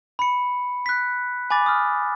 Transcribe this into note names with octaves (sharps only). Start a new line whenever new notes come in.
B5 C#7
F#6 B6
G#5 B5 D6 A6
D#6 F6